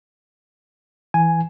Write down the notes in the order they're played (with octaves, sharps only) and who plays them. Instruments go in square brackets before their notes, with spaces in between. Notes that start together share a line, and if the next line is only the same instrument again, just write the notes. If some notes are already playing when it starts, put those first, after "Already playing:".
[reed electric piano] E3 [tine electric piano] G#5